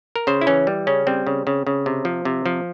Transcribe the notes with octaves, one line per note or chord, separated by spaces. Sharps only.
A#4
C#3 C5
E4
E3 C#4
G3
C#3 C#4
G3 C4
C#3
C#3
C#3
C3
F3
C3
F3